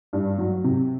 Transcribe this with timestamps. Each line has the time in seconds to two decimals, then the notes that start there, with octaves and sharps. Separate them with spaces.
0.13 G2
0.38 F#3
0.64 C3